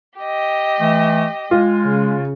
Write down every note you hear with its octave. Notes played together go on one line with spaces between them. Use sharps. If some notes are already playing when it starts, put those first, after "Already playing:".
G4 D#5
E3 A3
G#3 F4
C#3